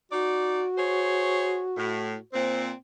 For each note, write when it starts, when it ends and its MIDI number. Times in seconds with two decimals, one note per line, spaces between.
0.12 0.63 63
0.12 2.25 66
0.12 0.63 74
0.78 1.63 68
0.78 1.63 72
0.78 1.63 73
1.77 2.15 45
2.34 2.73 46
2.34 2.73 60
2.34 2.65 72